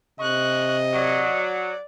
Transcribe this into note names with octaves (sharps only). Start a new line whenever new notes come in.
C3 D#5 C#6 F#6
F#3 D5